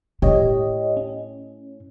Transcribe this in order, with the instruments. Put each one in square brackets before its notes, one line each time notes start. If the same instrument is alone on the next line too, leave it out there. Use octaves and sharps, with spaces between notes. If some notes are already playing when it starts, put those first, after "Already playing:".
[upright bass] A2 [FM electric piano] G4 C#5 D#5
[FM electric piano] C#4